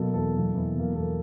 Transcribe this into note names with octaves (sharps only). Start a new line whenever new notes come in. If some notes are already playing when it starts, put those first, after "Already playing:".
Already playing: B2 F#3 A#3 A4
E2 A4
B2 F#3 A#3
E2
B2 F#3 A#3
E2 A4